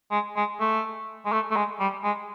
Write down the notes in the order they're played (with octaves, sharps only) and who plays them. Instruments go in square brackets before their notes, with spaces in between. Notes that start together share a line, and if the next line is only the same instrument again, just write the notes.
[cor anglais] G#3
G#3
A3
G#3
A3
A3
G#3
G3
G#3